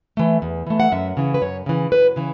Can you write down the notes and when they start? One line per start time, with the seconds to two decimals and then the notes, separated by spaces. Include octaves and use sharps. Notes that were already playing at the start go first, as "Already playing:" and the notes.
0.17 E3 A3
0.42 E2
0.67 E3 A3
0.80 F#5
0.92 F#2 E5
1.17 C#3 E3
1.34 B4
1.42 F#2 C#5
1.66 C#3 E3
1.91 F#2 B4
2.16 C#3 E3